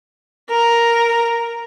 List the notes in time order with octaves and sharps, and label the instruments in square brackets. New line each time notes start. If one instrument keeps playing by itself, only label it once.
[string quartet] A#4